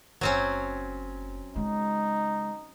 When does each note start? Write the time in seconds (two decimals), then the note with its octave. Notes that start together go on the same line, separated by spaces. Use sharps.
0.21 F#1 F#3 C4 C#4
1.56 C#3 G#3 D#4